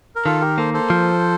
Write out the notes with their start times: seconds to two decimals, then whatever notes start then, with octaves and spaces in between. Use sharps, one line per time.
0.16 A#4
0.25 D#3 F4 A4
0.41 G4 A#4
0.58 A#3 A4 C5
0.74 A4 C5
0.90 F3